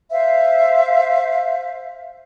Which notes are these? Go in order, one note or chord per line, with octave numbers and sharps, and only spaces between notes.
C5 E5 F5